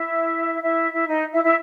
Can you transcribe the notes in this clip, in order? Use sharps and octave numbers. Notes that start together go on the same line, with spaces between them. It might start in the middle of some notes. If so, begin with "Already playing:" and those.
Already playing: E4 E5
E4 E5
E4 E5
D#4 D#5
E4 E5
E4 E5